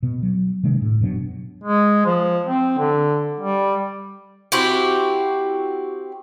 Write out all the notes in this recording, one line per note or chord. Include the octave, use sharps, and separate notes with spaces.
B2 B3
F#3
C3 D#3 G#3 D4
A2
F#1 B2 F#3 D4
G#3
F3
C4
D3
G3
C4 E4 F#4 G4